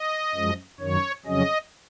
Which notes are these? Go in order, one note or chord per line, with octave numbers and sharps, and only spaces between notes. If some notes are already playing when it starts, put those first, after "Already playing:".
Already playing: D#5
F#2 F3 G#3
F#2 D#3 F#3 C#5
F2 C#3 F#3 C#4 D#5